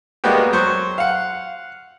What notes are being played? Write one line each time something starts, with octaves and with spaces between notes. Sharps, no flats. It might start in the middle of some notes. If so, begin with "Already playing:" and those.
G3 G#3 A#3 B3 F#4 G4
F#3 C5 C#6
F5 F#5